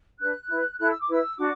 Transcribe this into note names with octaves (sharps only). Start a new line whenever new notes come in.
D4 B4 F#6
E4 B4
E4 A4 F#6
E6
D6
E4 B4 E6
D4 F#4 D6